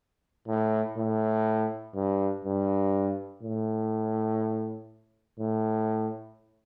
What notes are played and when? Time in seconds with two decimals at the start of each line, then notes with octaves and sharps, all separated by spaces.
0.48 A2
0.98 A2
1.96 G2
2.45 G2
3.43 A2
5.40 A2